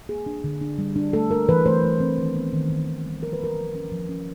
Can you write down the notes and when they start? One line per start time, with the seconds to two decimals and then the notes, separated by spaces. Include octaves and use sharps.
0.09 A#3 G#4
0.26 D4
0.44 D3
0.61 D4
0.78 G3
0.96 D4
1.13 A3 A4
1.31 A3 A#4
1.49 E3 B4
1.66 A3 C5
1.83 A3
2.00 C4
2.18 D#3
2.35 B3
2.53 D#3
2.70 D#3
2.88 D#3
3.05 G3
3.22 F3 A#4
3.33 B4
3.40 A#3 A#4
3.57 F3
3.75 C#4
3.92 F3
4.09 C#4